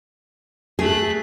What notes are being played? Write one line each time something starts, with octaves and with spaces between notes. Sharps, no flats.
A3 G#4 F#6